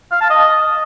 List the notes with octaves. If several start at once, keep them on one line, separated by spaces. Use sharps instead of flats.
F5
A5
D#5